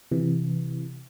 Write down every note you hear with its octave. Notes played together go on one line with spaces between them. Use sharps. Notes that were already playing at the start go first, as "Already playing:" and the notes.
C3 E3